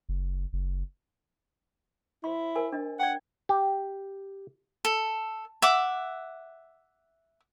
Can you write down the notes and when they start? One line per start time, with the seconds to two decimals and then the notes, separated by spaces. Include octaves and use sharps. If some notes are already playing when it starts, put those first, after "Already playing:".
0.09 F#1
0.53 F#1
2.24 E4 C5 C6
2.55 A#4 C5 G#5
2.72 D4 D#5
3.00 D5 F#5 G5
3.49 G4
4.85 A4
5.62 E5 F#5 D6